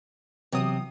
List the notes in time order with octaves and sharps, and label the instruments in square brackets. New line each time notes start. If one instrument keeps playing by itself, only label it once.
[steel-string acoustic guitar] C3 [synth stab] E3 F#3 D#6